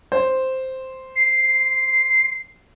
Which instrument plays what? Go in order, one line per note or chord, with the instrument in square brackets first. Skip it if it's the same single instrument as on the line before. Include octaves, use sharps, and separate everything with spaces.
[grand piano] C5
[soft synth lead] C7